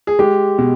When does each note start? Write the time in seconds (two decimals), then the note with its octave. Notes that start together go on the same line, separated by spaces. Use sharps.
0.07 G#4
0.19 G#3 G4
0.58 B2